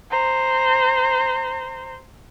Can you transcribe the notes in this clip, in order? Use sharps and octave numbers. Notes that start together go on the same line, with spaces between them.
C5 A#5